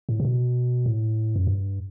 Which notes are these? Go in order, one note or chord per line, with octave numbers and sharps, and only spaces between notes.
A2
C3
B2
A2
F#2
G2